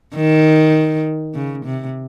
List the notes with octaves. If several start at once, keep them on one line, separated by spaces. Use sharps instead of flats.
D#3
C#3
C3